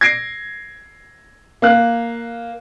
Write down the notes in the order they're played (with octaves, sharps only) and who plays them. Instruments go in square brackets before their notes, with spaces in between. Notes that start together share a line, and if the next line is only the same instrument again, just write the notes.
[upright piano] G#6 A#6 C7 D7
A#3 F5 F#6